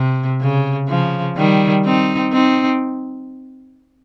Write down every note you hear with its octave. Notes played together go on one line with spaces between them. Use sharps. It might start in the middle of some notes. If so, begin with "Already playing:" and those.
Already playing: C3
C#3
C#3 F3
D#3 G3
C4 D#4
C4 D#4